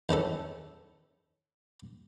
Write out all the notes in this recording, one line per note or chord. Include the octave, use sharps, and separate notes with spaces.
E2 D#3 C#4 A4